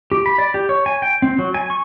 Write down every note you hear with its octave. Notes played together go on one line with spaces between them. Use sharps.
G4
B5
D5
G4
C#5
G#5
G5
C4
F#3
G#5
C#6